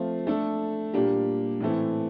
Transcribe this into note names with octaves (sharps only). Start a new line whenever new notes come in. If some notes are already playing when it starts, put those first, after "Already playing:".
Already playing: F3 A3 C4 F4
A3 D4 A4
A#2 G3 A#3 D4 G4
A2 E3 A3 C4